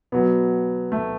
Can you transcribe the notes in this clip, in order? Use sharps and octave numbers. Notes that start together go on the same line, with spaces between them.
B2 F#3 B3
A3